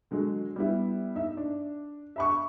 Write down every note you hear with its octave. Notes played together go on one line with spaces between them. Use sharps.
D3 F#3 G#3
G3 B3 E4
D#4 E5
D4
E5 B5 C#6